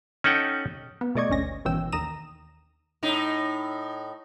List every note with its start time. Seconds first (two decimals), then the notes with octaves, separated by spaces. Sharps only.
0.24 C#4 D#4 A4 F#5 G5
1.01 B3
1.15 B2 A3 D5 D#5 C#6 G#6
1.29 G#1 D2 C#4 A#6
1.65 G#1 B2 E3 C#4 G5 E6
1.92 D#2 A#5 D#6 E7
3.03 A2 D#4